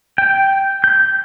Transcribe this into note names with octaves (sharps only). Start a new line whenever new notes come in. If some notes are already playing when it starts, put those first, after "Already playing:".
G5
G6